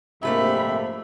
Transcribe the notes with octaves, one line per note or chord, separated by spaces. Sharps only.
A#1 G#2 C3 A3 A#3 C4 E5 B5